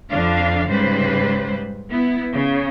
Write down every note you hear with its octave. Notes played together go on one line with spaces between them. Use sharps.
F2 D3 D4 F5
G#2 C#3 G3 B4 C5
B3 E4
C#3